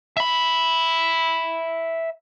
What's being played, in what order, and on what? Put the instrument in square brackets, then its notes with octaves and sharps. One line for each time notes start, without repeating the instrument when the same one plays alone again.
[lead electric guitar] E5 B5